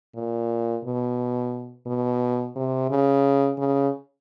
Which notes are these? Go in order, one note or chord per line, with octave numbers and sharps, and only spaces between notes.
A#2
B2
B2
C3
C#3
C#3